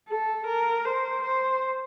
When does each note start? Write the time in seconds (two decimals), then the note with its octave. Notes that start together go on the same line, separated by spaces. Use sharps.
0.09 A4
0.47 A#4
0.85 C5
1.23 C5